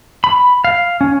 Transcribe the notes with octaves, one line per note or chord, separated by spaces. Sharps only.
B5
F5
C#4